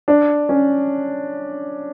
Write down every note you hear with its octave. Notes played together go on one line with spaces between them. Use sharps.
D4
C#4